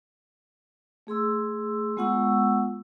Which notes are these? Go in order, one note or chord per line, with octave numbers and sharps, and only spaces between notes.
A3 G#4 C6 E6
G#3 B3 F4 F#5 C#6 E6